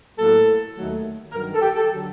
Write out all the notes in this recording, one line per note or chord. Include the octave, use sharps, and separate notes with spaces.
A2 F#3 A#3 A4
D#2 D#3 F#3 A3
G2 D#3 F#3 A#4
A4
G4
A4
D3 F#3